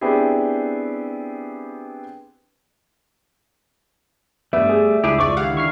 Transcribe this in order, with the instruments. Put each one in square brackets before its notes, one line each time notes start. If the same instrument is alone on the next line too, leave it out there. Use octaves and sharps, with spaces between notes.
[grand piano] B3 C4 D4 E4 G4 G#4
[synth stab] G2 B3 [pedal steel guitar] G3 A3 [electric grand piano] E5
[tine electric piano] G#4
[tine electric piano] C#2 [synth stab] D4 E4 [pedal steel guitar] G4 G#4
[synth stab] F2 G#2 D5 [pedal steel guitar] F4 C#6 D6
[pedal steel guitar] D3 D#3 E4 [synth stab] G4 F5 F#5
[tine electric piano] C#6 F6 C7